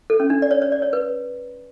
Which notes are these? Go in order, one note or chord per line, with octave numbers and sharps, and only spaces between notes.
A4
C#4
D4
D5
C#5
C#5
D5
C#5
B4